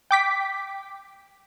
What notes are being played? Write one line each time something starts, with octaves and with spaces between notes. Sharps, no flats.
G5 D6 B6